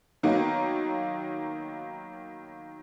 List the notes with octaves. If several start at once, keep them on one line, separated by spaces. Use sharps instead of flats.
D#3 F#3 A#3 B3 D#4